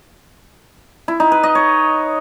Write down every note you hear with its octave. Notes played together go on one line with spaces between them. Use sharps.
E4
D#4
B4
D#5
C#5